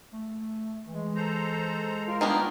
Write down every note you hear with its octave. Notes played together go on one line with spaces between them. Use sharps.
A3
E3 G#3
A4 C5 A#5
F4 A#4
D#3 A#3 B3 D4